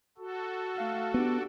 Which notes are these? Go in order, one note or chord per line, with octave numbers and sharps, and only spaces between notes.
F#4 A4
A3 F5
B3 D4 G4